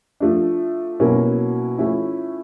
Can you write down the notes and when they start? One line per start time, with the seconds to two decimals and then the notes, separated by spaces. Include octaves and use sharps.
0.20 F3 A3 D4
1.00 B2 F#3 A#3 C#4 E4
1.78 F3 A3 C#4 E4